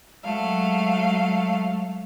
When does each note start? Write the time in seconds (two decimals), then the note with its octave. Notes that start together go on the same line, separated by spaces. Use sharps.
0.24 F#3 G#3 A3 F5